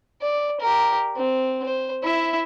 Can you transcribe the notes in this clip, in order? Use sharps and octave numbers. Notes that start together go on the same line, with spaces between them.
D5
G4 A#4
C4
C5
E4 E5